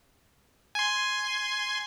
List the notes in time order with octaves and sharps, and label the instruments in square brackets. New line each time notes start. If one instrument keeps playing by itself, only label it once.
[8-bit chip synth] G#5 C6